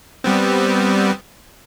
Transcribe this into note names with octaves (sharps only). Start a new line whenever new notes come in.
G3 B3 C4